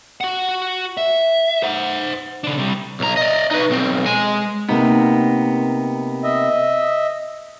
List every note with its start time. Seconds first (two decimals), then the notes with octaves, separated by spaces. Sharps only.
0.21 F#4 F#5
0.97 E5
1.63 C5 F#5
2.44 C#3 D4
2.58 C3 G3
3.00 B1 A#5
3.17 D5 D#5
3.51 D#4 B4
3.70 B1 C4
4.06 G#3 G#5
4.69 C3 A#3 B3 D#4
6.24 D#5 E5